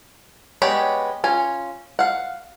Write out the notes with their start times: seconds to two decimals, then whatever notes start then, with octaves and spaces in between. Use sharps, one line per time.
0.62 G#3 B3 G4 C#5
1.24 C#4 F4 G#5
1.99 F5 F#5